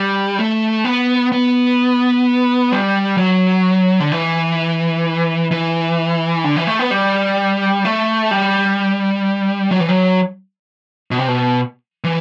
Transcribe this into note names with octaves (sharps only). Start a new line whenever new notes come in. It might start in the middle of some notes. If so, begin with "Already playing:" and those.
Already playing: G3
A3
B3
B3
G3
F#3
D3
E3
E3
D3
E3
A3
B3
G3
A3
G3
F#3
E3
F#3
B2
C3
B2
E3